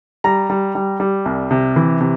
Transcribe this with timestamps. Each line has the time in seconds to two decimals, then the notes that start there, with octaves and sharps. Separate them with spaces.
0.24 G3 A#5
0.50 G3
0.75 G3
1.00 G3
1.26 C2
1.51 C3
1.76 E3
2.01 C3